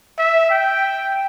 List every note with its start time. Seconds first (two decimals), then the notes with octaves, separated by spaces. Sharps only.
0.18 E5
0.50 G5